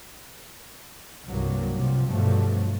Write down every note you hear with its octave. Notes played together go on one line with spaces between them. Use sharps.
C2 G2 F#3 A#3
G2 C3 F3
G2 B2 F3 F#3 A3